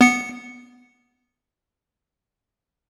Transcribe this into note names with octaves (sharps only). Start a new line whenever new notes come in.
B3 C#7